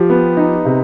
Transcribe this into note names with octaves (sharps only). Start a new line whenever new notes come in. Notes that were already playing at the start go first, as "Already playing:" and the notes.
Already playing: F3 G4
B3
D#4
C3